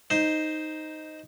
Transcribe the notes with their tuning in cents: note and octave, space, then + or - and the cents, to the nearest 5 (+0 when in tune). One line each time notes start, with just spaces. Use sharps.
D#4 +0 C5 +0